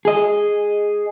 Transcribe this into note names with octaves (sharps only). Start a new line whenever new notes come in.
G#4 D#5